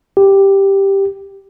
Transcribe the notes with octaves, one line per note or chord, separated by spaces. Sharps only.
G4